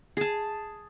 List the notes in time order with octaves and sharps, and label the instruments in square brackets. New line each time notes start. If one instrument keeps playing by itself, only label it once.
[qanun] G#4 A5